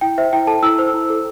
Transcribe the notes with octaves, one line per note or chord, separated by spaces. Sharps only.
E4 G5
C5 E5
E4 G5
A4 A5
E4 E6
C5
E4
A4